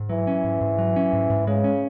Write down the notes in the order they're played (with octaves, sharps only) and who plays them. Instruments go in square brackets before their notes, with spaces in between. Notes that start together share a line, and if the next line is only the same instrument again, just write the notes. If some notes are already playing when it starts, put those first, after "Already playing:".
Already playing: [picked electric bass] G#2
[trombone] E3 [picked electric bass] F#3
[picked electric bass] C#4
G#2
G#2
F#3
C#4
G#2
G#2
[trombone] C#3 [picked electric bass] G#3
[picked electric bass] C#4